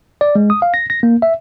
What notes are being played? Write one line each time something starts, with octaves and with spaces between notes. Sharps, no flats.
D5
G#3
D#6
F5
A#6
A#6
A#3
E5